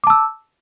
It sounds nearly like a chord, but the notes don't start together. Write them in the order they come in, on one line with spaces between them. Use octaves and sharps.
D6 A5 E6